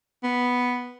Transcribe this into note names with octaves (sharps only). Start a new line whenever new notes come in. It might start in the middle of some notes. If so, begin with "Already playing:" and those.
B3